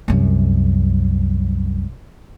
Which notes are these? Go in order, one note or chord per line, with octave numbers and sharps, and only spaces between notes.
C2 F#2